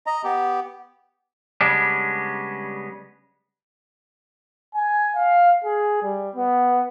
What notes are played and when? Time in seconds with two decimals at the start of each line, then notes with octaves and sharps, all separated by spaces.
0.06 D#5 A#5
0.24 B3 G4
1.61 C#3 G3 G#3 B3 C#4 D4
4.75 G#5
5.15 F5
5.65 G#4
6.03 G3
6.36 B3